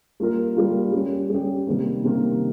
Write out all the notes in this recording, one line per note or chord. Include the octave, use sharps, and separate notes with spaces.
G3 A#3 F4 A#4
G3 A#3 F4 A#4
G3 C#4 G4
G3 C#4 G4
C3 D#3 G3 A#3
C3 D#3 G3 A#3